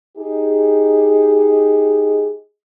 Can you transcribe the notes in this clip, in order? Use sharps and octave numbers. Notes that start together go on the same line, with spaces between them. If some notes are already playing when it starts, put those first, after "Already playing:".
D#4 G4 G#4